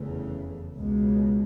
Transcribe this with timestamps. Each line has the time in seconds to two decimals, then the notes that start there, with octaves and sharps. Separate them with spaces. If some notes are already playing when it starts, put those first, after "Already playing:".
Already playing: F1 E2 C#3 E3 A3
0.76 C#2 B2 G#3